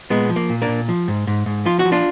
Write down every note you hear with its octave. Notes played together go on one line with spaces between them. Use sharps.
A#2 G#3 B3
F3
A#3
A#2
A#3 D4
A#2
F3
G#2
G#2
G#2
F3 F4
F#4
F3
D4 F4